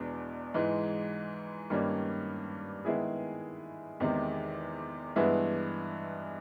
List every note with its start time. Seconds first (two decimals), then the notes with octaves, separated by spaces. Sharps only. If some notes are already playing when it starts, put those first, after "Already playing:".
Already playing: E2 B2 G#3 B3 D4
0.54 G#2 E3 G#3
1.70 G2 D#3 G3 A#3 C#4
2.85 D#3 G#3 B3 E4 G#4
4.00 E2 C3 D#3 G#3
5.16 G2 E3 G#3 B3 E4